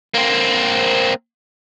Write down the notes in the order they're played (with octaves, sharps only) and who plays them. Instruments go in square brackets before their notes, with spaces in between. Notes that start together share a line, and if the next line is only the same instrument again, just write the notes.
[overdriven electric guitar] A#3 C4